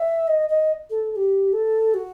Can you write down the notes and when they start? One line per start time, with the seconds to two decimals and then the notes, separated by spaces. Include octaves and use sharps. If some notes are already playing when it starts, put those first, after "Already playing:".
Already playing: E5
0.27 D#5
0.49 D#5
0.90 A4
1.11 A4
1.16 G4
1.53 A4
1.94 F#4